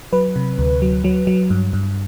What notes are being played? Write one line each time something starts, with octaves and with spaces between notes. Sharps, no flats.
F#3 B4
C3
D2
F#3
F#3
F#3
G2
G2